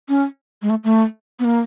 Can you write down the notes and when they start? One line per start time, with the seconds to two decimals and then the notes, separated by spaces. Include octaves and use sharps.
0.09 C#4
0.62 G#3
0.70 A3
0.84 A3
1.39 B3
1.45 A#3